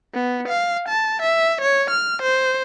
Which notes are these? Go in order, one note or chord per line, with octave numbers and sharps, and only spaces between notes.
B3
F5
A5
E5
C#5
F6
C5